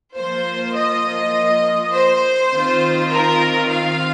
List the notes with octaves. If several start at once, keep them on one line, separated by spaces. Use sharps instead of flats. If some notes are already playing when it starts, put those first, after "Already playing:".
F3 A#3 F4 C5
D#5
C5
D#3 C4 F4
A#4
F5